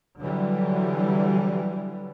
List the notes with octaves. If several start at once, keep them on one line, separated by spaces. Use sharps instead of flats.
D3 E3 F#3 G3